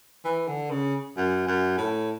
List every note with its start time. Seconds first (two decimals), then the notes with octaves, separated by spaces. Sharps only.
0.25 E3
0.48 D3
0.70 C#3
1.17 F#2
1.47 F#2
1.78 A2